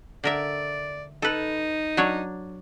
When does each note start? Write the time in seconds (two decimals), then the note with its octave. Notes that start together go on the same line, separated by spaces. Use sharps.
0.24 D3 A#4 D5 E5
1.22 D#4 A4 B4
1.97 F#3 D4 C#5